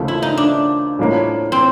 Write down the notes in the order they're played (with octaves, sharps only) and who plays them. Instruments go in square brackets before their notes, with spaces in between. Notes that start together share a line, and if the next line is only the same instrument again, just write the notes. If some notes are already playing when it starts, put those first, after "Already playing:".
Already playing: [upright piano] D#2 C#3 F3 A3
[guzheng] E4
D#4
D4
[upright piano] A2 F3 A#3 C#4
[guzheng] C4